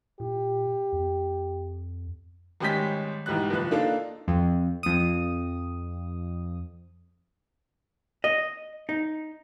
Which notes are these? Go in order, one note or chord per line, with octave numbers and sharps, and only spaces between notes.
A#2 G4
F2
G#1 G3 G#3 C#4 G6 B6
B1 G#2 E3 G3 F#6
F#1 F3 B4 F#6
A#3 D4 D#4 F4 A4
F2
F2 D#6
D#5
D#4